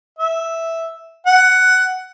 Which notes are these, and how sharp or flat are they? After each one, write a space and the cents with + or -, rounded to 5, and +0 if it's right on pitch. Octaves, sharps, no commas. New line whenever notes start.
E5 -5
F#5 +10